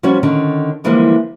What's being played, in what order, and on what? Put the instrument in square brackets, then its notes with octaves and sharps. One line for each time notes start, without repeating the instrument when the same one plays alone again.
[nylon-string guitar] F3 G3 C#4 F#4 C#5
D3 D#3 C#4
D3 E3 F3 G3 G#3 A#3